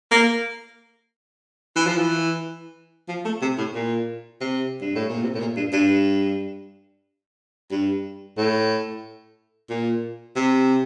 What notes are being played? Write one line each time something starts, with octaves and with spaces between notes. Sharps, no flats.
A#3
E3
F3
E3
F3
A3
C3
A2
A#2
C3
G2
A2
A#2
C3
A2
A#2
G2
G2
G2
A2
A#2
C3